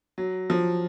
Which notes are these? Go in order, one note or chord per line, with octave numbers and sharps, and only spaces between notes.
F#3
F3